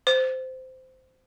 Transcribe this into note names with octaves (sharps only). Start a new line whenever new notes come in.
C5